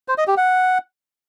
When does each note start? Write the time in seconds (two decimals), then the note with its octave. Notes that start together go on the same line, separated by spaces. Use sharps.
0.08 C5
0.18 D#5
0.28 G4
0.37 F#5